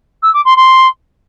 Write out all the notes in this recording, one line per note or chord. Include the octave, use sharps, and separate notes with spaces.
E6
D6
C6
C6